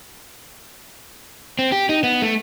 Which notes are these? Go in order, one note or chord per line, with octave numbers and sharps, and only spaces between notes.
C4
G4
D#4
B3
A3